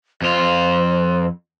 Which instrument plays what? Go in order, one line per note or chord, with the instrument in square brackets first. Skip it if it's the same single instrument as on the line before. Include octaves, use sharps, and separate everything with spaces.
[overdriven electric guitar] F2 F4 [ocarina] C5